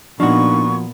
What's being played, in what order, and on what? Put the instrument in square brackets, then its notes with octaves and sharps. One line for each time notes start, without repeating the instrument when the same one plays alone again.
[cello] A#2 B3 [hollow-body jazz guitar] F3 F#4 [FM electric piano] D4 D#4 [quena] C#6